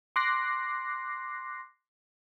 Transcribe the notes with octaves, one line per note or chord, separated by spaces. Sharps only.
C6 D6 F#6 A#6 C7